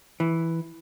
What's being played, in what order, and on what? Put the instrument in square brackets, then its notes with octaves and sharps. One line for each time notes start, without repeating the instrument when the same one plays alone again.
[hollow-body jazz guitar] E3